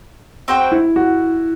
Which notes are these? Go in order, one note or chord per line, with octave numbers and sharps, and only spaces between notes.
C4 F#4 C5 G5
E4
F#4